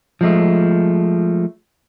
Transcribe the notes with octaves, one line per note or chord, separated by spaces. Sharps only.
F3 G#3 A3